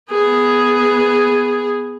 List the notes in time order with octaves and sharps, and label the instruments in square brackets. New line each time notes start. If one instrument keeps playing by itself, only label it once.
[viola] B3 G#4